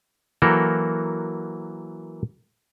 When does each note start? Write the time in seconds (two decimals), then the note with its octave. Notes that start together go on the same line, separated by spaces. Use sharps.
0.42 E3 F#3 A#3 F#4 A4 A#4